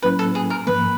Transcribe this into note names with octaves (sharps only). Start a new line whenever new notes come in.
A2 F#3 A#3 C#4 E4 B4
A4
G#4
A#4
G#2 F3 A#3 B4